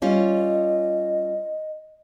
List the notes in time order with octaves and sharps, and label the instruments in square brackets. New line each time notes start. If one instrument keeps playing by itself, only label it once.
[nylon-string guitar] G3 C#4 F4 [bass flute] D#5